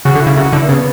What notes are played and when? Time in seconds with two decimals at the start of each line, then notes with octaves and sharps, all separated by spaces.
0.05 C#3 F#4
0.15 D3
0.22 E4
0.27 C#3
0.37 C#3 F#4
0.53 D3 E4
0.63 A#3
0.68 C#3 B3